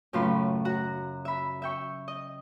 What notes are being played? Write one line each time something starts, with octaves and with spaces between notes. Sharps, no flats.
F#2 A2 C#3 F4 B4 C6
F#4 F#5 A#5
E5 B5
E5 G5 C#6
D#5